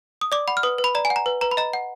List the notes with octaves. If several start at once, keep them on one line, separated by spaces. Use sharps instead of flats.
D#6
D5 D6
F#5 B5
F6
B4 D#6
B4
B5
D5 A#5
G#5
F#5
A#5
B4
B4 A#5
B5
D#5 A#5
F#5